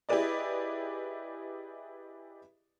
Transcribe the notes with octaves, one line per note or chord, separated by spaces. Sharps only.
E4 G4 G#4 B4 D5 D#5